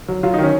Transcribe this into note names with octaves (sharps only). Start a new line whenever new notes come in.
F#3
F#3 F4
D#3 D#4
C#4